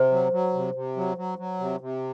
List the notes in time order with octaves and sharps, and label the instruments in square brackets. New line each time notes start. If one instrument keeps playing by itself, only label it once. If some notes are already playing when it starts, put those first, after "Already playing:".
Already playing: [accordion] C3 [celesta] C5
[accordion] F#3
F#3
C3
C3
F#3
F#3
F#3
C3
C3